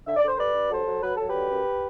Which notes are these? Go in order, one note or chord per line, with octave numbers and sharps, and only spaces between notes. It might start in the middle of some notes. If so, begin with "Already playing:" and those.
D3 E5
D5
D3 C5
G2 B4 D5
G2
F#3 A4 C5
F#3
F#3 B4
F#3 A4
G4 B4
D3
F#2